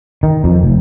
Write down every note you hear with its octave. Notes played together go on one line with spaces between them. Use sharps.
D#3
F2
F1